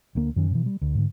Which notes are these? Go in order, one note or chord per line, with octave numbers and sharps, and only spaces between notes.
D2 D3 A#3
F#2 D#3 C#4
B2 E3
G3
D2
G#2 D3